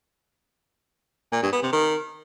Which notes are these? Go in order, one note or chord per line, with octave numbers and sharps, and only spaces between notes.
A#2
G2
B3
C3
D#3